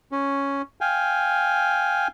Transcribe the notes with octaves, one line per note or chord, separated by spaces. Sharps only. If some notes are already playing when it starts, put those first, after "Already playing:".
C#4
F5 G5 G#5